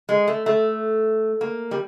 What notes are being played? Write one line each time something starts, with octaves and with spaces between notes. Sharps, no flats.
G#3
A3
A3
A#3
G3